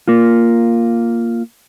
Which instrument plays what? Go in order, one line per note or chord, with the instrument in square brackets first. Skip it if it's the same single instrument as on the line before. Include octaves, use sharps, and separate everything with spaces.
[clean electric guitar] A#3 F4